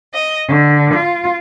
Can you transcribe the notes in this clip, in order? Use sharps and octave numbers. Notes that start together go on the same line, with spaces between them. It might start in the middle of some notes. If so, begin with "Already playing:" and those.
D#5
D3
F4